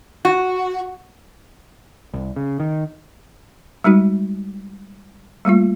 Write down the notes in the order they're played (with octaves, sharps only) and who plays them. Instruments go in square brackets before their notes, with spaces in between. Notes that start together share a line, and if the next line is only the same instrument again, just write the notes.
[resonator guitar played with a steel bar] F#4
[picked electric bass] C2
C#3
D#3
[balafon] G3 G#3 D#4 F#4
G3 A3 A#3 F4